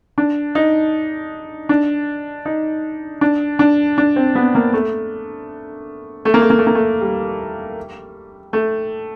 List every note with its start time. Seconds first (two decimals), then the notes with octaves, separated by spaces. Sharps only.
0.18 D4
0.55 D#4
1.69 D4
2.45 D#4
3.21 D4
3.59 D4
3.98 D4
4.16 C4
4.35 B3
4.55 A#3
4.73 A3
6.25 A3
6.34 A#3
6.41 A3
6.50 A#3
6.58 A3
6.67 A#3
6.75 A3
7.01 G3
8.53 A3